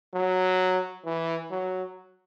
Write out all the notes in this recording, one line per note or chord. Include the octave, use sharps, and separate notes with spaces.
F#3
E3
F#3